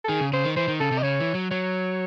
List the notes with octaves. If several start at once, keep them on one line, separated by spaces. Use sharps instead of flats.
A4
D#3 G#4
C#3
C#3 C5
D#3
E3 C5
D#3
C#3 A4
C3
D#5
C#3 C#5
E3
F#3
F#3 C#5